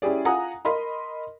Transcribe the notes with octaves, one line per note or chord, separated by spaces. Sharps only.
C#4 E4 G4 G#4 D5
F4 F#5 G#5 A#5 D#6
A#4 D#5 B5 C6